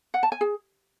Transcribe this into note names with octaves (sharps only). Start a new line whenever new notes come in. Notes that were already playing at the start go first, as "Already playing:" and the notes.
F#5
A5
G#5
G#4